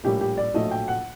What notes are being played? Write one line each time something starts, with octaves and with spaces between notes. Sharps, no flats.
A#1 A2 G3 A#3 G4
G4
D5
A#1 A2 F#3 A3 D#5
G5
F#5